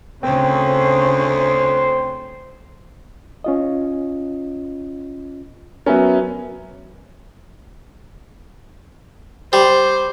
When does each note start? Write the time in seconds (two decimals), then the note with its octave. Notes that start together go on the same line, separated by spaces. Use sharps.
0.23 D2 C#3 C4 C5
3.44 C#4 F4 D#5
5.86 F#3 B3 C#4 A#4 B4 E5
9.53 G3 C5